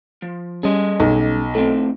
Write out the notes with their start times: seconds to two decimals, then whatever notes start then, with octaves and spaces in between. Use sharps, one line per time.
0.22 F3
0.63 G3 C#4 G#4 A4 D#5
1.00 B1
1.55 A2 C4 A4